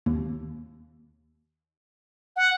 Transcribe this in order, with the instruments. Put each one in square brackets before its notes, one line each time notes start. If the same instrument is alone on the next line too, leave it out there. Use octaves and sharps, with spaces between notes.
[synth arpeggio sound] D#2
[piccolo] F#5